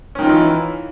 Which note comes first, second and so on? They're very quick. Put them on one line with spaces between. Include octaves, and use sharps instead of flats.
C#4 D#3 F4 D#4 E3